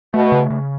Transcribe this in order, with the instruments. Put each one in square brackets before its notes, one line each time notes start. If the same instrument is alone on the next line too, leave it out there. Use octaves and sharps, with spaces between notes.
[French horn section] B2 [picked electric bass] A3
[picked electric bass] C#3
C#3